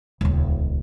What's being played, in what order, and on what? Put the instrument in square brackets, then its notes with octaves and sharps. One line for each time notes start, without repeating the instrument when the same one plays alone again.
[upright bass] D#1 C#2